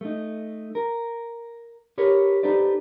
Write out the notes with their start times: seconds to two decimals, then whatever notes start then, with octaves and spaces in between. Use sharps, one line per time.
0.01 A3 D#4
0.75 A#4
1.98 G4 A#4 B4 C#5
2.43 D#4 G4 A4 B4 C5 D5